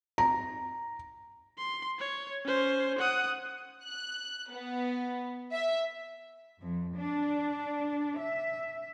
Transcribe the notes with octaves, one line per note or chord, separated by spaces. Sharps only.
A#5
C6
C#5
C#4 C5
F#5 D#6
F#6
B3
E5
F2
D4
E5